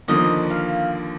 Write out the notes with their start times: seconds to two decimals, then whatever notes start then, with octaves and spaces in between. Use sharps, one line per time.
0.08 D#2 D3 F3 A#3 D#5
0.50 F5